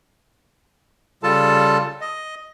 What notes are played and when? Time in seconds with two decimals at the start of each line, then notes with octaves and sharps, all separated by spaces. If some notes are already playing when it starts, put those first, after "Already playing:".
1.23 C#3 G3 F4 A4 A5
2.01 D#5